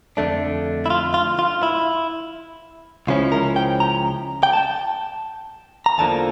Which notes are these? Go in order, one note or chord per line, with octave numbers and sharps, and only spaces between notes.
F2 D3 A3 D4
E4
F4
F4
F4
E4
C#2 C#3 F3 C#4 E4 F4
A#4
G5
A#5
G5
A5
A#5
E2 D3 F3 A#3 A5